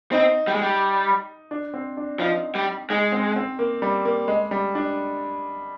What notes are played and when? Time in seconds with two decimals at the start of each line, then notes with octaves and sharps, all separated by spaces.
0.12 C4 D#4
0.47 G3
0.54 G#3
0.62 G3
1.51 D4
1.74 C4
1.97 D4
2.20 F3 D#4
2.55 G3
2.90 G#3 D#4
3.12 C4
3.36 C4
3.59 A#3
3.82 G3
4.05 A#3
4.28 G#3
4.51 G3
4.75 D4